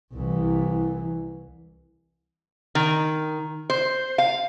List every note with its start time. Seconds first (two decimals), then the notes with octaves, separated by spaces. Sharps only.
0.14 C2 E3
2.75 D#3
3.70 C5
4.18 F5